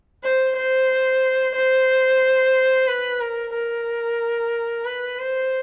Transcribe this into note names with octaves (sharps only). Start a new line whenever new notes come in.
C5
C5
C5
B4
A#4
A#4
B4
C5